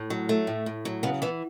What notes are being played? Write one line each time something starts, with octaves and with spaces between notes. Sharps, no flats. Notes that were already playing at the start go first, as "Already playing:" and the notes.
Already playing: A2
F#3
A3
A2
A2
F#3
C#3 B3
E3 B3